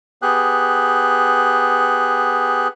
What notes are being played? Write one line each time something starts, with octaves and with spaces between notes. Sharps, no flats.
B3 G4 G#4 F#6